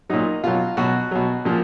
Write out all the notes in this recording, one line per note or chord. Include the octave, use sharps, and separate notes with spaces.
A#2 F#3 D#4
B2 F#3 F4
B2 F#3 F#4
B2 F#3
A#2 F3